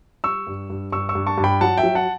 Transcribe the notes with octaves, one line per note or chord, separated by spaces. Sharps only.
G3 C#6 E6
G2
G2
G2 C#6 E6
C#6 E6
G2
A5 C#6
G2
G5 B5
F#3 F#5 A5
E5 G5
F#3
F#5 A5